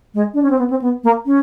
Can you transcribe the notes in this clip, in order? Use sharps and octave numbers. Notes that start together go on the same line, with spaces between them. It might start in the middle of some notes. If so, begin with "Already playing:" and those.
G#3
D4
C#4
C4
B3
C4
B3
A#3
C#4